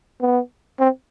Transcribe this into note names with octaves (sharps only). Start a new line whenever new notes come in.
B3
C4